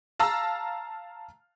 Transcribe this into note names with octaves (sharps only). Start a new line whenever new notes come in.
F5 A5 A#5 E6 F6